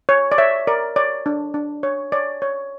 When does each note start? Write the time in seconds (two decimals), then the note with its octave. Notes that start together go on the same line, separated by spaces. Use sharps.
0.09 C#5
0.32 D5
0.38 C#5 E5
0.67 A#4 D5
0.96 C#5 D5
1.26 D4
1.54 D4
1.83 C#5
2.12 C#5 D5
2.42 C#5